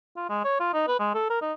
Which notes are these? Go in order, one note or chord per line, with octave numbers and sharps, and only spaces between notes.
F4
G#3
C#5
F4
D#4
B4
G#3
A4
A#4
D#4